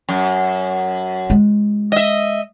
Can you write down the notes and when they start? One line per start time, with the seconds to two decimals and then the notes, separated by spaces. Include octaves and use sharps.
0.09 F#2
1.30 G#3
1.92 D#5 E5